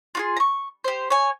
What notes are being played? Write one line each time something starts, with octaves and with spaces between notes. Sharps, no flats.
F4 F#4 G#4
A#5 C#6
G4 C5
C#5 G#5